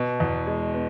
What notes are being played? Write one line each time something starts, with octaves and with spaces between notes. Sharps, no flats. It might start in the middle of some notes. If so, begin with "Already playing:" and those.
Already playing: B2
E2
G#3
B3